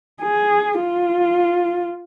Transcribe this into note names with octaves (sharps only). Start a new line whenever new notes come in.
G#4
F4